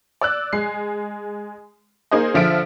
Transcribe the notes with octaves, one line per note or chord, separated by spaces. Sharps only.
D5 E6 F#6
G#3 C7
A#3 D#4 G#4 C5 D#5
D3 F3 E5 D7